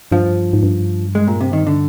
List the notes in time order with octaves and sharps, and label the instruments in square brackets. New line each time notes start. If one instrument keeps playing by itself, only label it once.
[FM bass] G2 [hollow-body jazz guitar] F3
[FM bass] G#2
G2
[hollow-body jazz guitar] G#3
A#2
C3
D#3
D3